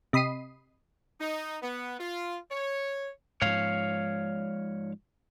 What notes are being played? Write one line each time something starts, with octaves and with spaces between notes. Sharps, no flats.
C3 D#5 B5 D#6 C7 D#7
D#4
B3
F4
C#5
G#2 F3 C#5 F5